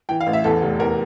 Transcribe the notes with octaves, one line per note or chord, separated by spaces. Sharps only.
E3 G5
F5
A1
E5
E2 A4
F1
E2 A#4